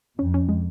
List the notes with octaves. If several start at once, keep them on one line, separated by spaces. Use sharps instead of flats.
F2 C#4
C#4
G#3